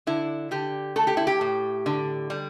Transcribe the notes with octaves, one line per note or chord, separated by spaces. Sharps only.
D3 E4
D3 G4
A3 A4
G4
E4
G4
A2
D3
G3